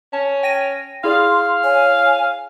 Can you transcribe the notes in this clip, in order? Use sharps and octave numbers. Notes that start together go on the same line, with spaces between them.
C#4 A5
G5 A#6 D#7
E4 G#4 D5 F5 C6
C#5 G#5